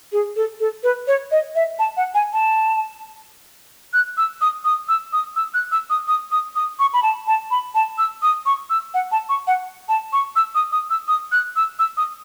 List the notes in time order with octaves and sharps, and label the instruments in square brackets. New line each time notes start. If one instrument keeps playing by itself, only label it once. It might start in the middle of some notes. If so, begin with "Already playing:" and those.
[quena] G#4
A4
A4
B4
C#5
D#5
E5
A5
F#5
G#5
A5
F#6
E6
D#6
D#6
E6
D#6
E6
F#6
E6
D#6
D#6
D#6
D#6
C#6
B5
A5
A5
B5
A5
E6
D#6
C#6
E6
F#5
A5
C#6
F#5
A5
C#6
E6
D#6
D#6
E6
D#6
F#6
E6
E6
D#6